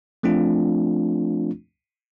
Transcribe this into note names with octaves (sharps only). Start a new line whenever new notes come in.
F3 A3 C4 D4 F4